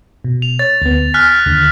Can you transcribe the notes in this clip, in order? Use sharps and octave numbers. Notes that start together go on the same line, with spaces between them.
B2
F7
C#5 A6
D2 B3
G#5 F6 F#6 B6
D#2 D3